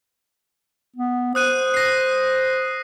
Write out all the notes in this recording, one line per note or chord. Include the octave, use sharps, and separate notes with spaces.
B3
C5 D#6 F#6 D#7
A#6 C7